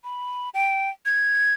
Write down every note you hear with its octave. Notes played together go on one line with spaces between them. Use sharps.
B5
G5
G#6